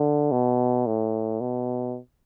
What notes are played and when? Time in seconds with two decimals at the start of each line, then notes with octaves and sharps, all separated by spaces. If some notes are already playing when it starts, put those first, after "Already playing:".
Already playing: D3
0.31 B2
0.86 A2
1.40 B2